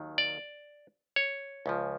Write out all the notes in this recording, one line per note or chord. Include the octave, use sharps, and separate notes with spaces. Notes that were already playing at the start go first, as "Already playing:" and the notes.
Already playing: D#2 D#3 F#3
D5
C#5
C#2 C#3 F3